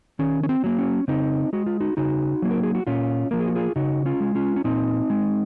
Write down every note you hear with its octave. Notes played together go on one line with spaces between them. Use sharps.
D#3 C#4
C#4
C4
F#3 A#3
C#4
C#3 C4 D#4
G#3 F#4
F4
D#4 F#4
C#3 D#4 F#4
F#3 A#3
A#4
G#4
F#4
A#2 C#4 F4
F3 A#3 A#4
G#4
F#4
F4 G#4
C#3 D#4 F#4
C#4 F4
G#3
C#4 F4
C#4
A#2 C4 D#4
G#3